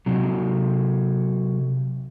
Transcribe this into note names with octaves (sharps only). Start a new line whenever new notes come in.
C3 F#3